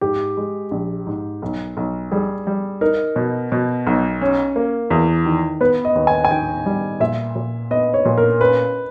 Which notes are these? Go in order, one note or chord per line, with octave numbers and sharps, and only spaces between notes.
G#2 G4
G#3
A#1
G#2
B1
B1
G3 G#4
G3
D#4 A#4
B2
B2
B1
C#4
A#3
E2
D#3
B3 B4
D#5
D#2
G#5
G#5
D#3 G5
G3
A#2 E5
A#2
B3 D#5
C#5
A#2
A#4
C#4 B4